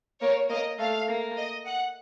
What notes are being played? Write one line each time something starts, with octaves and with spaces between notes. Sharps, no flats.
A#3 C#5
A#3 D#5
A3 F5
A#3
D#5
F#5